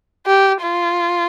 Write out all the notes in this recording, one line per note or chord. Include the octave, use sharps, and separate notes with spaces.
G4
F4